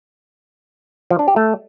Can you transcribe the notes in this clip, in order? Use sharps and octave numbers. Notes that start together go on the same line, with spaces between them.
F3
D4
G4
A3